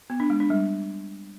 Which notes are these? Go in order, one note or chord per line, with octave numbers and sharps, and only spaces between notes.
B3
D4
G#3
D4
G3